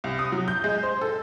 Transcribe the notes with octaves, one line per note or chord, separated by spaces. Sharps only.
C2
D#6
F#3
G6
G#3
C5
A4